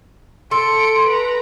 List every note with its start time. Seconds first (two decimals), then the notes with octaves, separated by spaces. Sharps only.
0.51 A4 C6 C#7 D7
1.07 B4 A#5